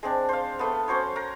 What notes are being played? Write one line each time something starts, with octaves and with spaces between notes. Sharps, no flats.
G#3 C4 D4
C5 F5
A3 B3
C#4 F#4 C5 C#5
A#4 A#5